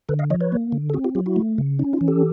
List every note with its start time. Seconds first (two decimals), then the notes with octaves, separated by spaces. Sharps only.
0.09 D3 A4 B4
0.19 D#5 F5
0.30 F3 C#5 D#5
0.41 B4 C#5
0.52 A#3
0.72 D3
0.90 A4
0.94 C4 F#4 G#4
1.04 F4 G4
1.15 F#3 F4 G4
1.26 E4 F#4
1.36 A3
1.58 C#3
1.79 C#4 D#4
1.93 D#4 F4
2.01 E3
2.08 G4 A4